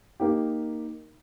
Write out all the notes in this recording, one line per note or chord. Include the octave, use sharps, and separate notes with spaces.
A#3 D#4 G4